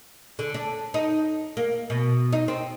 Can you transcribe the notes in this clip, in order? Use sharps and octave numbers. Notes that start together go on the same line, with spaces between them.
D3
D4
D#4
A#3
B2
D#4
C4